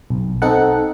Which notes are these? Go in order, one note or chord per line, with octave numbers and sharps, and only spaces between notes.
B1
C4 D#4 A4 F#5